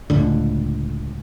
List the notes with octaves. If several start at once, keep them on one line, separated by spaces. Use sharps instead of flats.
C#2 A2 D3